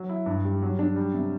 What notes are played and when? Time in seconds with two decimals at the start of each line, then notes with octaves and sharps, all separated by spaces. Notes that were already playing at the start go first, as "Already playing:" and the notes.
Already playing: F#3
0.09 E4
0.26 G2
0.45 G3
0.62 F#3
0.79 D4
0.96 G3
1.14 C3